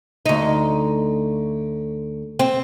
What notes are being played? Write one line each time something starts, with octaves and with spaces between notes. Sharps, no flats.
D2 D#4
C4